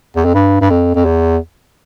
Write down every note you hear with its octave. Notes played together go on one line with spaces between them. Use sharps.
E2
F2
G2
G2
F2
F2
E2